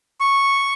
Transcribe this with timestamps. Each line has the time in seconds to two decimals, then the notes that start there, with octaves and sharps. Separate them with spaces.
0.20 C#6